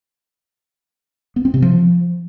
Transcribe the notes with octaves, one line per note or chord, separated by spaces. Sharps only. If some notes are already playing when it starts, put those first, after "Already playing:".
B3
C4
C3
F3